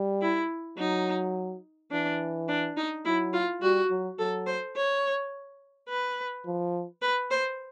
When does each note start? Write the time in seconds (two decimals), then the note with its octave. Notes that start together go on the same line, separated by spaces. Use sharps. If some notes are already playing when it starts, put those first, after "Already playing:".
Already playing: G3
0.21 E4
0.78 F#3 D#4
1.92 E3 D4
2.48 D4
2.77 D#4
3.05 F#3 E4
3.33 F4
3.61 G3 F#4
3.90 F#3
4.19 F#3 A4
4.47 C5
4.76 C#5
5.89 B4
6.46 F3
7.02 B4
7.31 C5